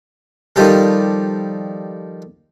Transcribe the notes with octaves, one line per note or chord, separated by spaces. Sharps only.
D#3 F3 G3 G4 A4